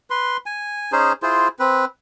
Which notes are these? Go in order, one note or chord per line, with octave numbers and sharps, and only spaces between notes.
B4 C6
G#5
C#4 D#4 G#4 C5
E4 F4 G#4 C5
C4 B4